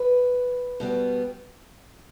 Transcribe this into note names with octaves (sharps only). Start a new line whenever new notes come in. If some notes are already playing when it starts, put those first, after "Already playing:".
Already playing: B4
B2 G3 B3